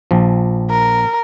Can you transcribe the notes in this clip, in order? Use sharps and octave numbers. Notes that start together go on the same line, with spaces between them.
A#1 F3
A#4